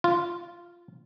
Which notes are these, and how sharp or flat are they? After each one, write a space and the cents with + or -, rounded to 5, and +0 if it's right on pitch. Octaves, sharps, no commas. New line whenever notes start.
F4 -10